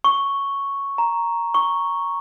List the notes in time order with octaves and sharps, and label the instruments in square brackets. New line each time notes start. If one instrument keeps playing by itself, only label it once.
[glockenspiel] C#6
A#5
C#6